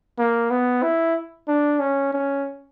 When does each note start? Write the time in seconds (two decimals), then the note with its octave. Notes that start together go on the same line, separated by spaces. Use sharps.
0.18 A#3
0.50 B3
0.83 E4
1.48 D4
1.79 C#4
2.13 C#4